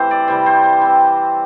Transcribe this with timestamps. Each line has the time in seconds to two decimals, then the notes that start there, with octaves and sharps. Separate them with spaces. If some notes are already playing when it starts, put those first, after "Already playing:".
Already playing: A2 E3 C4 G4 C5
0.11 D5
0.28 C3 E3 G3 C5
0.46 C5
0.63 C5
0.81 E3 C4